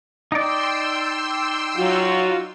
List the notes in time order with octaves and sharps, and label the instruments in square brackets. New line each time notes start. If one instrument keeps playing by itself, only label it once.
[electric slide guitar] D#4 D5 [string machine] G5 C6 E6
[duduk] F#3 [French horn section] F4 F#4